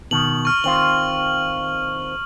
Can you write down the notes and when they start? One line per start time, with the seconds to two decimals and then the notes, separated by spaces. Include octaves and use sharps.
0.11 B2 D#3 F#7
0.45 C#6 F6
0.64 D#3 C4 F4 F#7